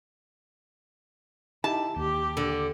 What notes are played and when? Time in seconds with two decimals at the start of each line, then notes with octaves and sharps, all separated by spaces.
1.64 D#4 E4 G4 A5
1.96 D#2 G4
2.37 D3